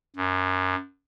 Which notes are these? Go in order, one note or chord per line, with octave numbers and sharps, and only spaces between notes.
F#2